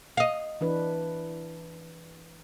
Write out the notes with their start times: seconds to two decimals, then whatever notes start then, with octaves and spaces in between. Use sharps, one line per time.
0.17 D#5 F5
0.61 E3 D4 B4